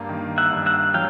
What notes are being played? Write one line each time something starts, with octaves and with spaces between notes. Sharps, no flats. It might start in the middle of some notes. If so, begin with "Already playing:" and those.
Already playing: G2 A#3
D#3
E5 F#5
G2
E5 F#5
F#3 F5 G5